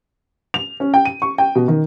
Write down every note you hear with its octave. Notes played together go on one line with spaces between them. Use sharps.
F7
C#4
G5
D#7
C#6
G5
B2
D#3